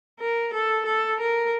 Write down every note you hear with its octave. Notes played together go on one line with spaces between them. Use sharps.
A#4
A4
A4
A#4